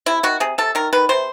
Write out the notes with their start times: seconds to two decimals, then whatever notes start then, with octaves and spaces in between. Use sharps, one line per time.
0.06 C3 E4
0.23 D#3 F#4
0.40 C3 G#4
0.58 C3 A4
0.75 D#3 A#4
0.93 D#3 B4
1.09 C3 C5